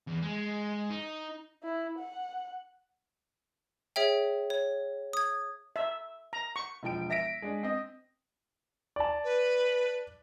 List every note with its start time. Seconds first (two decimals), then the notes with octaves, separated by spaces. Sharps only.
0.07 E2
0.22 G#3
0.90 D#4
1.63 E4
1.98 F#5
3.96 G#4 C#5 E5 G5
4.50 C#5
5.13 D#6 G#6
5.76 E5
6.33 A#5
6.56 C#6
6.83 E1 F3 G5 D7
7.10 E5 A#6 B6 D7
7.42 G#3 D4
7.63 C4 D#5
8.96 D5 A5
9.24 B4